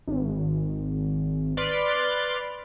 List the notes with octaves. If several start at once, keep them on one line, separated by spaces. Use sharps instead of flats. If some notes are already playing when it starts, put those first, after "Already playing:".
G#1
B4 D5 B5 C6 D6 F6